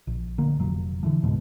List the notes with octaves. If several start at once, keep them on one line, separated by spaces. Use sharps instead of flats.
A#1
D3 A#3
F1 A#2 F#3
D3 E3 F3
F#1 C#2 G#2 B2